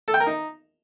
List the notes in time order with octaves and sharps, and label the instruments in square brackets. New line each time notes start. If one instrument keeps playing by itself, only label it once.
[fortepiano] A4
G5
A#4
D#4